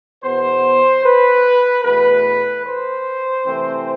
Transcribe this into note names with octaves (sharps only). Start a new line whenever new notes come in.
E2 B2 B3 C5
B4
E2 B2 A3 B4
C5
C3 E3 A3 C4